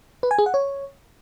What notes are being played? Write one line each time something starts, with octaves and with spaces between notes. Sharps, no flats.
B4
G#5
G#4
F#5
C#5